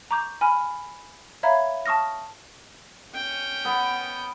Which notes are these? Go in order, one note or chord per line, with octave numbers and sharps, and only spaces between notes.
A#5 C#6 D6 G6
G#5 B5 F6
C#5 E5 F5 A#5 B5 G#6
A5 C#6 D#6 F6 A#6
C#4 G5
B3